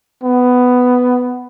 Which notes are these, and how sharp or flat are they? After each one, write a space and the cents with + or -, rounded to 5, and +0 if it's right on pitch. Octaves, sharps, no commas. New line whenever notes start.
B3 +10